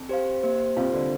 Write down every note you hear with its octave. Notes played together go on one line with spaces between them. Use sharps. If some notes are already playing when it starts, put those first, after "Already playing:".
Already playing: F2
G4 C5 F5
A#3 G4 C5
C2 C3 F4 C5 F5
D3